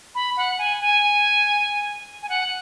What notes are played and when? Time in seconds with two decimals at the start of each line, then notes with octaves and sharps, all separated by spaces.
0.15 B5
0.37 F#5
0.58 G#5
0.80 G#5
2.22 G#5
2.29 F#5